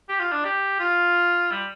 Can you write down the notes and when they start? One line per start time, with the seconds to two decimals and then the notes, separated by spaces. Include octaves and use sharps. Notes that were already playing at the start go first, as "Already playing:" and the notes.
0.09 G4
0.20 F4
0.32 D4
0.44 G4
0.80 F4
1.51 G3